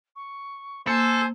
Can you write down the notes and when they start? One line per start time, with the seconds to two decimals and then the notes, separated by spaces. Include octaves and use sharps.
0.15 C#6
0.87 A#3 A4 C5 G#5